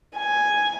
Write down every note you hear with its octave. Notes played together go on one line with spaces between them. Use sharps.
G#5